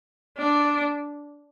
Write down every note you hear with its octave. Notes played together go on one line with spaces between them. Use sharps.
D4